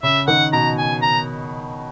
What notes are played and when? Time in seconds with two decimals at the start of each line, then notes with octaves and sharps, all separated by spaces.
0.03 C#3 E5
0.27 D#3 F#5
0.53 B2 A#5
0.78 G#5
1.02 A#5